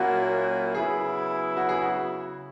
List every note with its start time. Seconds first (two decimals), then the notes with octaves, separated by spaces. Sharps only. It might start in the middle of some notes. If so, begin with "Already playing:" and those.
Already playing: A#2 F#3 A#3 C#4 E4 F#4
0.74 C#3 F#3 B3 E4 G#4
1.57 F#4
1.69 G#4
1.81 F#4